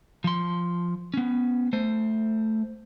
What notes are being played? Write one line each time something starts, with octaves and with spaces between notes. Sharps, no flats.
F3 C6
B3 C#4
A3 C5